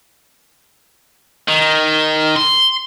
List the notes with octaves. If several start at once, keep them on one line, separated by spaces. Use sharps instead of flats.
D#3
C6